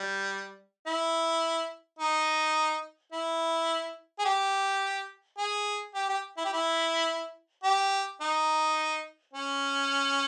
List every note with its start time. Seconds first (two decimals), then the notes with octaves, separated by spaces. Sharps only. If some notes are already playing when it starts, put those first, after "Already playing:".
Already playing: G3
0.87 E4
1.99 D#4
3.12 E4
4.19 G#4
4.25 G4
5.38 G#4
5.95 G4
6.09 G4
6.37 E4
6.45 G4
6.53 E4
7.64 G4
8.21 D#4
9.34 C#4